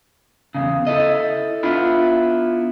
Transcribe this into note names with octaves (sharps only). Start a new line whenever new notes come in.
E2 A#2 C#3
E4 A4 D#5
B3 D4 E4 F4